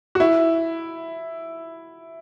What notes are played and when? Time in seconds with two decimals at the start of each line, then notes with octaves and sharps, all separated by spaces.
0.15 F#4
0.20 E4